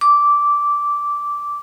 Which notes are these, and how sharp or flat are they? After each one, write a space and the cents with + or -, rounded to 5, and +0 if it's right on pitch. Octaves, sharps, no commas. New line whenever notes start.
D6 -10